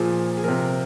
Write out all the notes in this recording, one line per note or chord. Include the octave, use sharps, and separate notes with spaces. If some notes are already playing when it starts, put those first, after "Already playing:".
Already playing: A#2 F3 G#4
G#4
C3 F3 A#4